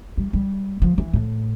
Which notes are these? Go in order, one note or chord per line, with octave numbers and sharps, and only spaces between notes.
G3
G3
F3
E3
A2